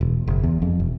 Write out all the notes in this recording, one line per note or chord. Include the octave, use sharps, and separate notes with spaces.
E1
F#1
E2
F2
E1